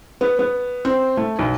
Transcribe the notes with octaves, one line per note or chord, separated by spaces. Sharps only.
B3
B3
C4
A3
B1